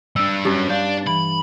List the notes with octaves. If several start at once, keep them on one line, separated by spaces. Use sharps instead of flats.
G3 D4 E6
G2 F#3 C#4
D4 F5 G6
E3 B5